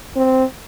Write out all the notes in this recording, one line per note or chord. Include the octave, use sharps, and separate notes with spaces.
C4